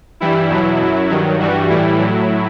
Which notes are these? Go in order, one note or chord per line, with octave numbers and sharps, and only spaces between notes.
G2 E3 G3 E4
E2 B2 F#3
F#2 F#3
G2 D#3 F#3
G2 E3 G3 F#4
A2 E3 G3 E4
A2 F#3